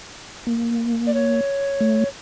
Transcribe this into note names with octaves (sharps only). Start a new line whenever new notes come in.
A#3
D5
C#5
A3